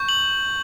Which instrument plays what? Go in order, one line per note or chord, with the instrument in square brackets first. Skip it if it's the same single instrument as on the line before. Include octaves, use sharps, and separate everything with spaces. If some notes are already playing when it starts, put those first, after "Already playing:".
Already playing: [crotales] C#6 G6
F#7